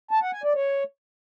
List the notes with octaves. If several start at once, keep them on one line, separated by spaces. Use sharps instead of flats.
A5
F#5
G#5
D5
C#5